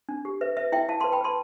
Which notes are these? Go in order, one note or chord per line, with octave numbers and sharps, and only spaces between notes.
D4
G4
B4 E5
B4 E5
E4 E5 G5
E4 F5 A5
A5 C6
B4
G5 B5
B4 A5 C6